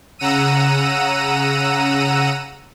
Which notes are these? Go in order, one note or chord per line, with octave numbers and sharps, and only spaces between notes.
C#3 F#5 A#5 E6 D#7